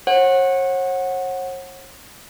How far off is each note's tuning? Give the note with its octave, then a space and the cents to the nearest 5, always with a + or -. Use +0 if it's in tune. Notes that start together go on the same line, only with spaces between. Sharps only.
C#5 -40 F#5 -5